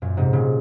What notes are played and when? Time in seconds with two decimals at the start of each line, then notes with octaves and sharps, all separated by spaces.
0.02 F#2 A#2
0.17 G#2 C3
0.33 A#2 C#3